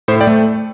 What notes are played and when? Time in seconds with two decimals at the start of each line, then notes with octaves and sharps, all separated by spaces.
0.08 A2 C5
0.20 D5 G5
0.27 A3